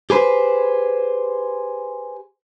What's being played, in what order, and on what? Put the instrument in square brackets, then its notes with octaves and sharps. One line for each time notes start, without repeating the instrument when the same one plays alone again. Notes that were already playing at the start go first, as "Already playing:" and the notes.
[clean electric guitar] G4 G#4 B4 C5